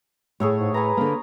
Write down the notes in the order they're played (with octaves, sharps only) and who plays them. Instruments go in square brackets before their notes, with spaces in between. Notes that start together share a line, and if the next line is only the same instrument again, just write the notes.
[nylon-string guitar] A2 [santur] G#4 A4 C#5
[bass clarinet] G#2
[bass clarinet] B4 [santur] G#5 A#5
[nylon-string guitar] D3 A#3